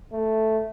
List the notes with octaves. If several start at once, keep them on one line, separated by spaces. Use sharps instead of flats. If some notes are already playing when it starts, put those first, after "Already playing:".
A3